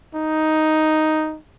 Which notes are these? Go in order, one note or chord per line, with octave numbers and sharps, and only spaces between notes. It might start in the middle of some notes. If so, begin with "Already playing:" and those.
D#4